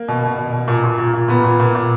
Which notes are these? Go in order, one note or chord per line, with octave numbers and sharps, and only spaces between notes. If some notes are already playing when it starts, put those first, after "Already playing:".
Already playing: A#3
B2
B2
B2
B2
A#2
A#2
A#2
A#2
A#2 B3
A#2
A#2
A#2